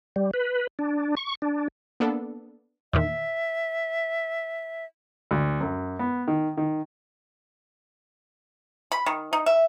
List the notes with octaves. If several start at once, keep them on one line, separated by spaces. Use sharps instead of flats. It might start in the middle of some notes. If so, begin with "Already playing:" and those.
G3
B4
D4
C#6
D4
A#3 B3 D4 A4
E2 A#2 D#3 E5
D2
F#2
B3
D#3
D#3
B5
D#3
D#4
E5